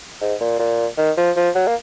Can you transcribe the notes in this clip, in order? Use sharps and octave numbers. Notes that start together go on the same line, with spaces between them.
G#2
A#2
A#2
D#3
F3
F3
F#3
A#3